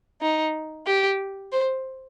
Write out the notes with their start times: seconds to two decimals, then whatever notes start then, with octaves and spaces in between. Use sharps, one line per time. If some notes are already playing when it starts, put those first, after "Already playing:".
0.22 D#4
0.87 G4
1.52 C5